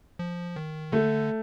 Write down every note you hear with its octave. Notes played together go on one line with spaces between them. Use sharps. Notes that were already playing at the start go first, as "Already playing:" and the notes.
F3
D#3
D3 A3